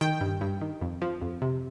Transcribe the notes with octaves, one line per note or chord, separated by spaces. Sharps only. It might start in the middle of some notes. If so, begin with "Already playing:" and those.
D#3 G5
G2
G2
D#3
F2
F3
F2
C3